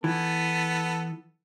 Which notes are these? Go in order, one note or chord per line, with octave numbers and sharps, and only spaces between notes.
E3 B3 A4